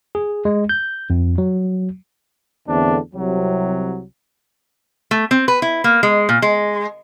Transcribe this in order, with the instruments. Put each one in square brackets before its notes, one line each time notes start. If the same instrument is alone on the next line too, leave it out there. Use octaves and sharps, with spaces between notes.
[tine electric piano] G#4
G#3
G6
F2
F#3
[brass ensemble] E2 A2 D3 C4 D4
C2 C3 F#3
[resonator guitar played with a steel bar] A3
C4
B4
E4
A#3
G#3
A#2
G#3